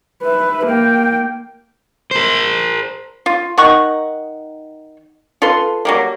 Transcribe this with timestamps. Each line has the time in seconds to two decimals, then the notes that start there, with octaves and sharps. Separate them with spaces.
0.23 B4 E5
0.66 A#3 G5
2.11 A#4 C5
3.26 F4
3.58 D#3 D#4 F#5 C#6
5.42 F4 A4 B4 C6
5.85 F#3 G3 A#3